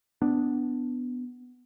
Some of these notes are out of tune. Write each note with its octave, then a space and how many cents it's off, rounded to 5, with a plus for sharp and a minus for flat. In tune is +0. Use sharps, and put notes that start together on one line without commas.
B3 +10 D4 +0